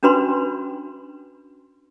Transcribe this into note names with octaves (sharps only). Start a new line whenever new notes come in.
C#4 D4 F#4 B4 B5 C6